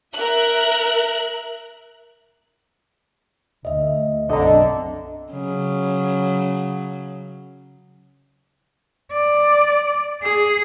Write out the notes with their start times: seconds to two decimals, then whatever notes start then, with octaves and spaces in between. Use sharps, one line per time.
0.14 A#4 E5 F#6
3.65 D2 D#5 E5
4.29 B1 F#2 D3 C4 D#5 A#5
5.31 C#3 F#3
9.12 D5
10.23 G#4